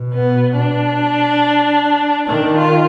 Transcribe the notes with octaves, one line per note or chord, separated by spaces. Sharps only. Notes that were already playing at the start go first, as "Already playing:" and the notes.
Already playing: B2
B3
D4
D#3 D4
F4